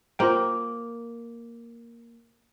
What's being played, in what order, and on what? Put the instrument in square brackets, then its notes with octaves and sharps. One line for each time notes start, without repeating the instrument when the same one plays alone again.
[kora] A#3 [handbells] F4 C5 G5